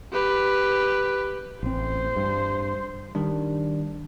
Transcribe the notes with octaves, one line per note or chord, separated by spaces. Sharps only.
G4 B4
A1 C4 C5
G2
D#3 G3 D4